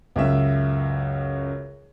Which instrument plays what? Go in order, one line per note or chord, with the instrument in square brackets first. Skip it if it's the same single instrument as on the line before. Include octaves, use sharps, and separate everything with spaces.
[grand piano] C#2 F#2 E5